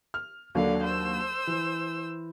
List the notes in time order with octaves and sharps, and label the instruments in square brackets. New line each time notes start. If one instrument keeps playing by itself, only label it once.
[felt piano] F6
[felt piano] D#2 F#3 D4 [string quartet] D3 F5
[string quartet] C5 E6
[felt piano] E3